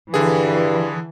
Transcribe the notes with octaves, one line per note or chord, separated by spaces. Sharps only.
G2 D3 E3 G#4